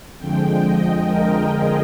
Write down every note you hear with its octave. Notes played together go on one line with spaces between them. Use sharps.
F2 D3 F3 G#3 G5
D#5
A#4
G#4